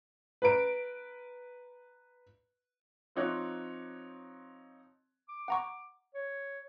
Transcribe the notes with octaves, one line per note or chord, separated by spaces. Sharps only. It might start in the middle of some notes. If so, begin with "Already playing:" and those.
B4 A#5 D7
F3 C4 D#4 C#5 D6 F#6
D6
F#5 A#5 C#6
C#5